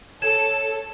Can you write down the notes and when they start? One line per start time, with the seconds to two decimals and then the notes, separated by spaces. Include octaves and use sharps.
0.22 A4 C#5 G#6 E7